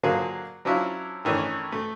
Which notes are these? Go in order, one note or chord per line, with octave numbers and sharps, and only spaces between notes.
D3 F3 F#3 A#3 G#4
F3 F#3 C#4 D4 E4 F4
D#3 E3 A3 C#4 D4
A3